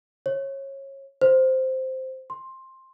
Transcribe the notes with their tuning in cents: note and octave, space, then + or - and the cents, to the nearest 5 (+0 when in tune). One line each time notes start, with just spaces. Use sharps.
C#5 -25
C5 -5
C6 +10